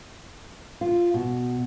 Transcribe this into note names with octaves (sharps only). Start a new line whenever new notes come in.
F4
B2